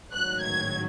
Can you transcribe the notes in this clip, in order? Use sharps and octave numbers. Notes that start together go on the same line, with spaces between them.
A1 G#2 D#3 F#3 F#6
G#6